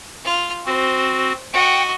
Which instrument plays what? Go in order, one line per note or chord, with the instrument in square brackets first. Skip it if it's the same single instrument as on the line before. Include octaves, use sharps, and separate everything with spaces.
[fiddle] F4 F6
[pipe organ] C4 F#4 [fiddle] C5
[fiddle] F#4 D#5 [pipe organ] F#5 G5